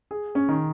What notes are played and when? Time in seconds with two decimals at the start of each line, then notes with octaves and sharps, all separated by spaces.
0.11 G#4
0.35 C#4
0.49 D#3